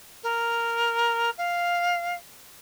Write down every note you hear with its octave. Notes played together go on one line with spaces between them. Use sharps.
A#4
F5